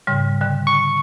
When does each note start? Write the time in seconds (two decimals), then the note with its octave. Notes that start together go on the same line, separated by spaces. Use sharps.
0.07 G#2 C#3 G3
0.41 D3 G3
0.67 C#6